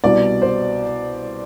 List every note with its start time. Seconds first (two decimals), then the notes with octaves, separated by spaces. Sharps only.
0.04 C2 B2 D5
0.42 C5